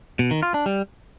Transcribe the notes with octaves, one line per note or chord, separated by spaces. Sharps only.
B2
D#3
F4
D4
G3